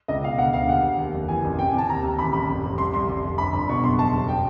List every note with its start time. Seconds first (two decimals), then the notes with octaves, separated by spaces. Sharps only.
0.08 C#2 D#5
0.24 B2 F5
0.38 D2 F#5
0.53 D2 F5
0.68 D#2 F#5
0.83 D#2
0.98 D#2
1.14 F1
1.28 E3 G#5
1.44 A1
1.59 C3 G5
1.68 G#5
1.73 C3
1.78 A5
1.88 D#2 A#5
2.03 D#2
2.18 A1 B5
2.33 A1 B5
2.49 F1
2.64 C3
2.78 C2 C6
2.93 C2 C6
3.08 F1
3.24 F1
3.38 G1 B5
3.53 G1 B5
3.69 B2 C#6
3.83 F#1 C6
3.98 E1 A5
4.13 E1
4.28 G5